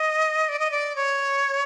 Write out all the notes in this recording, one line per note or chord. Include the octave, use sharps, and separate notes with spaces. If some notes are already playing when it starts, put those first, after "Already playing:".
Already playing: D#5
D5
D#5
D5
C#5